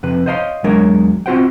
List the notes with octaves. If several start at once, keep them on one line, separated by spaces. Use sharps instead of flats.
F2 C3 B4
C5 C#5 D#5 F5 A5 C6
E2 F#3 G#3 D4 A#4 C#5
C4 F4 F#4 C5 F#5 G5